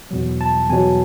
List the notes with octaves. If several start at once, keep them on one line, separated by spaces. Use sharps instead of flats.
E2 B2 F#3
A5
E2 B2 F#3 G#5